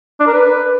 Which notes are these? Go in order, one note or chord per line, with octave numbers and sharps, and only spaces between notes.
D4
A#4
B4